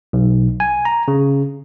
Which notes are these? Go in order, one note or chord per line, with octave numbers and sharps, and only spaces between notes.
B1
G#5
A#5
C#3